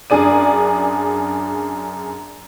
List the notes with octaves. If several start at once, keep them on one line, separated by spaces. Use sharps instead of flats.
F#2 D4 G#4 D5 D#7